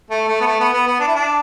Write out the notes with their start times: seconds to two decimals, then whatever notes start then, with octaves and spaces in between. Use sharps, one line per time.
0.10 A3
0.28 A3
0.41 B3
0.46 A3
0.60 B3
0.74 B3
0.87 B3
1.00 D4
1.08 E4
1.15 D4